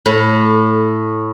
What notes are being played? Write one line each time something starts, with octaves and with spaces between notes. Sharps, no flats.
A2